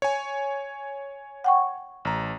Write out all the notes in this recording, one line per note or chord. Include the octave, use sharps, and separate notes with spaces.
C#5 G#5
F#5 G5 C#6
A1 A#5